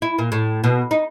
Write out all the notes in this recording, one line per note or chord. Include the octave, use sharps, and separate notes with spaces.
E4
A#2
A2
B2
D#4